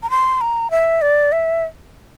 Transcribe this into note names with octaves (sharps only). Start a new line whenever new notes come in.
A#5
C6
A#5
E5
D5
E5